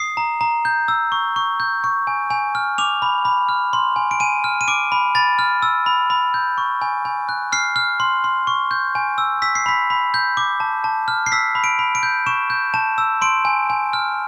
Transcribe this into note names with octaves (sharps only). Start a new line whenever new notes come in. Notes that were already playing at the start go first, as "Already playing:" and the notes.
Already playing: D#6 C7
A#5
A#5
G6
E6
C#6
C#6
G6
C#6
G#5
G#5
F6
D6 F7
B5
B5
F6
C6
G#5
D7
G#5 D#7
F6
D#7
D6 D7
B5
B5 A6
F6
E6
B5
B5
G6
C#6
G#5
G#5
F#6
F6 C7
F6
C6
C6
C#6
G6
G#5
E6
E6 B6
C7
B5 B6
B5
G6
D6
A5
A5
F6
C7
E6 B6
B5
D7
B5
D7
G6
C#6 E7
G6
A5 E7
E6
C6 D7
G#5
G#5
F6